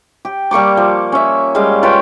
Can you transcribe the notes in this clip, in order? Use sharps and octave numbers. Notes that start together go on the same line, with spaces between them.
G4
G3 A#3 C#6 D6
F3
C#4 E5
G3 G#3 F5
F4 B4 C#5 G5